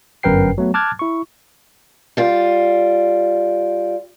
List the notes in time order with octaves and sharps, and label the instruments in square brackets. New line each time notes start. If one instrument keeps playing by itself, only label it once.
[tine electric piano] G1 F#2 A#4 B4 G5 C7
F#3 A3 B3
A5 D6 F6 F#6 G#6 A6
E4 C#6
[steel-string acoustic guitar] G3 F4